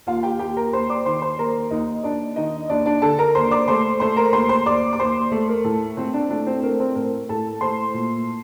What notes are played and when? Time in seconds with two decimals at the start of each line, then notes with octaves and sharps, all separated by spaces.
0.07 D#2 F4 F5
0.23 G4 G5
0.39 D#2 G4 G5
0.57 A#4 A#5
0.73 D#2 C5 C6
0.89 D5 D6
1.05 D#3 C5 C6
1.22 C5 C6
1.38 D#2 A#4 A#5
1.71 D#2 D#4 D#5
2.03 D#2 D4 D5
2.36 D#3 D#4 D#5
2.69 D#2 D4 D5
2.86 D4 D5
3.02 D3 A4 A5
3.19 A#4 A#5
3.35 D#2 C5 C6
3.51 D5 D6
3.68 A3 C5 C6
4.00 A3 C5 C6
4.17 A#4 A#5
4.33 D#2 C5 C6
4.49 C5 C6
4.66 D#2 D5 D6
4.93 D6
4.99 D#2 C5 C6
5.32 A3
5.49 A#4
5.64 A2 A4
5.97 A2 C4 C5
6.14 D4 D5
6.30 A3 D4 D5
6.47 C4 C5
6.63 A3 A#4
6.80 C4 C5
6.95 A2 A#4
7.29 A2 A4 A5
7.61 A3 C5 C6
7.94 A#2